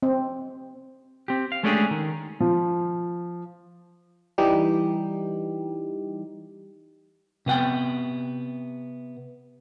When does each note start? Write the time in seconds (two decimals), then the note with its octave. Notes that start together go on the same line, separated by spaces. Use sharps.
0.03 C4
1.28 C4 G4
1.52 F5
1.63 G#3 A3 C#4 D4 G4 G#4
1.91 D#3
2.40 F3
4.38 E3 G3 D#4 G4
7.46 C3 B3 F#5 G5